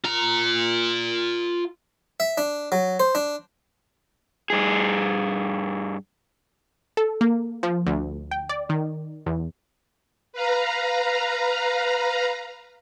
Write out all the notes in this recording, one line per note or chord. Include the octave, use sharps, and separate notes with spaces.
F4 A#5
E5
D4
F#3
C5
D4
G2 G#4
A4
A#3
F3
D2
G5
D5
D#3
E2
B4 F5 A#5